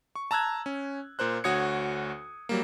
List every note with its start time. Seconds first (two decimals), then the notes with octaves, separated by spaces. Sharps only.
0.16 C#6
0.31 A5 A#5 E6 F#6 G#6
0.66 C#4
1.19 A#2 A#4 C5 F#6
1.44 D2 F#4 C#5 D#6 G#6 C#7
2.49 F#3 G3 A#3